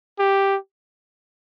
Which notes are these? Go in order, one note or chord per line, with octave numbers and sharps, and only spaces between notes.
G4